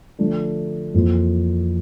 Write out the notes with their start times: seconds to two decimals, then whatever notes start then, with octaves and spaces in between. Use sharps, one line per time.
0.19 D3 F3 A3 D4
0.94 F2 E3 A#3 F4